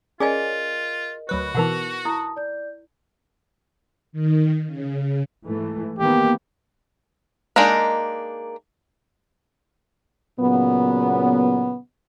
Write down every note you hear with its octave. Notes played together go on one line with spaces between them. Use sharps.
C#4 F4 G#4 A#4 D5 D#5 G#5
D2 F#3 F#4 B4
B2 E3 D#4 A#4 F#5 F7 F#7
E4 A5 D#6
D5 G6
D#3
C#3
G#2 E3 A3
D#3 A#3 B3 G4
G#3 A#3 D4 D#4 A#4
A#2 C#3 F#3 B3